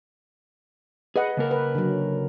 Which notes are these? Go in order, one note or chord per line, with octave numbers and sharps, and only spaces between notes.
G#4 B4 D#5 F#5
C#3 A#3 A#4
B4
D3 F#3